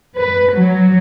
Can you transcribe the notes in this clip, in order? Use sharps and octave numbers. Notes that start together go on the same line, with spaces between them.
B4
F#3